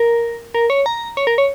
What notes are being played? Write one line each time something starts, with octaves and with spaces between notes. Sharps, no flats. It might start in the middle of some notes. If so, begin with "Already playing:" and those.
Already playing: A#4
A#4
C#5
A#5
C#5
A#4
C#5